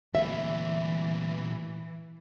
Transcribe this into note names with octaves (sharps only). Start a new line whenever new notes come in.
D2 A#2 E3 E5